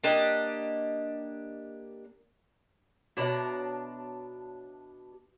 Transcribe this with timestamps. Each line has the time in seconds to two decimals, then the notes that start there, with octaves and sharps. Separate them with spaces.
0.04 A#3 D4 G4 D#5
3.17 B2 D4 F#4 C#5 E5 A#5